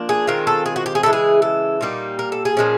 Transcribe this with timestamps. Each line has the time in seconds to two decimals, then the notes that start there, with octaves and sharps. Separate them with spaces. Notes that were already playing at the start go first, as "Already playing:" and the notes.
Already playing: F3 A#3 D4
0.09 G#4
0.27 D#3 G#3 C4 F4 A#4
0.47 A4
0.66 G#4
0.76 F#4
0.86 G4
0.95 G#4
1.03 C#3 E3 G#3 A4
1.13 G#4
1.42 A4
1.81 A#2 G3 A#3 D#4
2.19 A#4
2.32 A4
2.45 G#4
2.57 A#2 F3 G#3 C#4